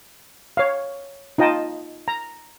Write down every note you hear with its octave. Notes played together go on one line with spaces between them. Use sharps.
C#5 F5
D#4 F4 D#5 G5 A5
A#5